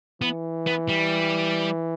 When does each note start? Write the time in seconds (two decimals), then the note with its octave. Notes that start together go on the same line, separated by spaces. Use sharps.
0.22 E3 B3
0.67 B3
0.89 G3